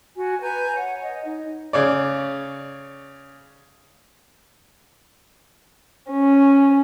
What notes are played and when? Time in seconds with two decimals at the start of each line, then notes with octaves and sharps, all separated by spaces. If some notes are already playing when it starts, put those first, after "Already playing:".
0.16 F#4 G#5
0.41 B4 G#5 A#5 G6
0.76 C#5 F#5
1.03 D#5
1.25 D#4
1.73 C#3 C#5 D5
6.10 C#4